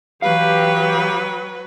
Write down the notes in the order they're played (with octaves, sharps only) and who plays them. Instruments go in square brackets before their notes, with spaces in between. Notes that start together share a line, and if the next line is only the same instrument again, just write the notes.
[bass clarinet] E3 [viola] F#3 B4 [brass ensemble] G4 [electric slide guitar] F5